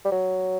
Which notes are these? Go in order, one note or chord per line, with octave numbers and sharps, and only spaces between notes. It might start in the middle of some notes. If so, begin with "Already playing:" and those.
G3
F#3